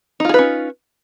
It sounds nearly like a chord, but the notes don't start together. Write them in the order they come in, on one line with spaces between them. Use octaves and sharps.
D#4 F4 G#4 B4 C#4